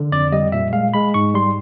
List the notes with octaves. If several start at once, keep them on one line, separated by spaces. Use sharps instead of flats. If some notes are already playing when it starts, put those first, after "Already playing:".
Already playing: D3
F2 D5
G3 D#5
A#2 E5
G#3 F5
G#3 B5
G#2 C#6
G3 C6